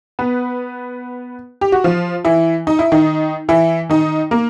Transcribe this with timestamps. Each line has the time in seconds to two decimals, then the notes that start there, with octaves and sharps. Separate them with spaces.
0.19 B3 B4
1.61 G4
1.72 F#4
1.84 F3 F4
2.25 E3 E4
2.67 D#4
2.79 E4
2.92 D#3 D#4
3.49 E3 E4
3.89 D#3 D#4
4.31 A#3